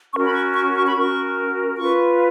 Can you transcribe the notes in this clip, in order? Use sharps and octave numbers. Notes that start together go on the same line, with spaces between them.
C#4 F#4 A#4 C#6
B5
C#6
C#6
C#6
B5
C#4 F#4 A#4 C#6
F4 B4 C#6